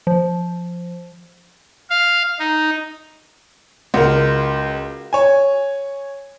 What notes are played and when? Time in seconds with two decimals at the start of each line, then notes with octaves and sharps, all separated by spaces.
0.07 F3
1.90 F5
2.39 D#4
3.94 C#2 F#4 A#4
5.13 C#5 G#5